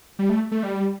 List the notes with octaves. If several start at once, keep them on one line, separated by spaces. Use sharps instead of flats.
G3
A3
A3
G3